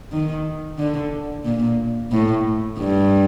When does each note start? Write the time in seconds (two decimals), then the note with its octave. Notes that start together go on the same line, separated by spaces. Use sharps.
0.12 D#3
0.78 D3
1.45 A#2
2.12 A2
2.78 G2